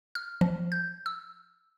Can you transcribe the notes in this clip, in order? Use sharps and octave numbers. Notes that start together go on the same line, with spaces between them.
F6
F3
G6
E6